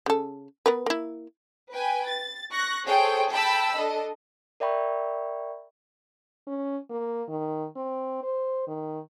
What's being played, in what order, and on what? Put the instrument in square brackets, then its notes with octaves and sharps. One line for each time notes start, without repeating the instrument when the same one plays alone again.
[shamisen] C#3 A4
B3 A#4 B4
A#3 E4
[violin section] B4 G5 G#5
A6
C#6 F#6 A#6
G#4 A4 C5 C#5 G5
G5 A5 B5 E6
D4 A4 D#5
[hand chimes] A#4 D5 E5 G5 B5 C#6
[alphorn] C#4
A#3
D#3
C4
C5
D#3